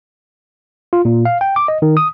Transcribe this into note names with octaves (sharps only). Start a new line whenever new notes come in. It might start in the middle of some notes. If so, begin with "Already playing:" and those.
F4
A#2
F5
G5
D6
D#5
D#3
D#6